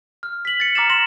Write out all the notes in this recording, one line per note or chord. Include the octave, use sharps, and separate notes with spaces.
F6
B6 F#7
A6 C#7
A#5 D6 F6 A6 E7
C6 A#6 E7 F#7